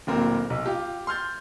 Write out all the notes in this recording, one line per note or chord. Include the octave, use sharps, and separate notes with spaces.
D1 A#2 C4 A#4
B1
F4 G4
C6 F6 G6 A6